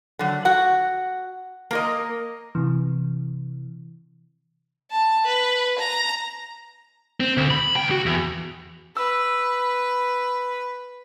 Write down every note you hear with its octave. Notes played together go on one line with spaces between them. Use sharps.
D3 F#3
F#4 F#5
A#3 A#4 D#5
C3 E3
A5
B4
A#5
C4
D2
B5
C#2 G5
F#4
E2
B4 E6